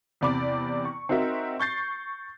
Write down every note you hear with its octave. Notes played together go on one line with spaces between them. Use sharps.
E2 C3 D5 B5 D6
C#6
C4 D#4 F#4 A#4 E5
C#6 G6 A6 C7